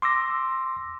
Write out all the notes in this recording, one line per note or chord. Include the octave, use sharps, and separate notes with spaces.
C6 D6 E6 A#6